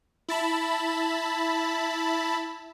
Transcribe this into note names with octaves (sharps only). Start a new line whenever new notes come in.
E4 A5 B5